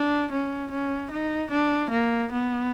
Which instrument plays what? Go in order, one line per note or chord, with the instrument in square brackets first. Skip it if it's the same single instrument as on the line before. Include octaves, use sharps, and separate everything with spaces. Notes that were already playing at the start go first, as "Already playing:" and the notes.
Already playing: [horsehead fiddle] D4
C#4
C#4
D#4
D4
A#3
B3